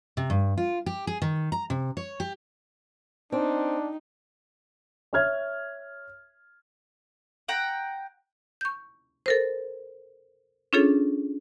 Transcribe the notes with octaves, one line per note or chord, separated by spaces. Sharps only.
C3
G2
F4
G4
G#4
D#3
A#5
C3
C#5
G4
C4 D4 D#4
C#5 E5 F6 G#6
F#5 G5 A#5
C#6 G6
A4 A#4 C5
C#4 D4 F4 G#4 A4 C#5